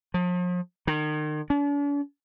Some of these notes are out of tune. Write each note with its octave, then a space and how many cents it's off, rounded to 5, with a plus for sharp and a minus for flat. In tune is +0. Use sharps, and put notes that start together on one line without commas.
F3 +40
D#3 -35
D4 -45